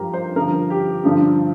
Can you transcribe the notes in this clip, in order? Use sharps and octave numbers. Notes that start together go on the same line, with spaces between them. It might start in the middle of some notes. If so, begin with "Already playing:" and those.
Already playing: G2 F3 G4 A#4
C5
G2 D3 F3 A#4
G4
G2 D3 F3